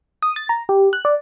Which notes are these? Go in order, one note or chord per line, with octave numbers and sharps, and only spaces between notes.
D#6
A6
A#5
G4
F#6
D5